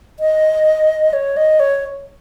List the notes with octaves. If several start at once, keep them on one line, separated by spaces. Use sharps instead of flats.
D#5
C#5
D#5
C#5